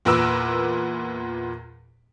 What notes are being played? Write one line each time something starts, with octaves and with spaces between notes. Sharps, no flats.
E2 A#2 A#4 B4 D6 E6